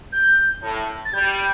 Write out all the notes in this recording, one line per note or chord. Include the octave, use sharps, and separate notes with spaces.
G6
A2
A6
G3 G6
G6